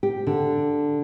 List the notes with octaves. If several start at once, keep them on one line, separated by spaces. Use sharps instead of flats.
G4
D3